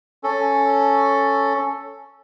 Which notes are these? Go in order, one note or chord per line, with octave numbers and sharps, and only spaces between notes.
C#4 A4